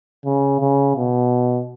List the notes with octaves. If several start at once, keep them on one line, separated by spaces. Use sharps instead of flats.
C#3
C#3
B2